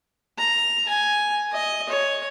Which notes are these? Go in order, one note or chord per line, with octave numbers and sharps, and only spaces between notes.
A#5
G#5
D#5
C#5